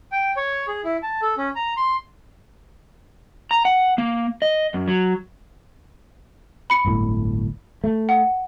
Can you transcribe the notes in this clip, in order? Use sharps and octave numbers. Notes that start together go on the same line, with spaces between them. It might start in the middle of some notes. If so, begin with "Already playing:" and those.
G5
C#5
G#4
E4
A5
A4
C#4
A#5
C6
A#5
F#5
A#3
D#5
F#2
F#3
B5 C#7
D1 G1 A2
A3
F#5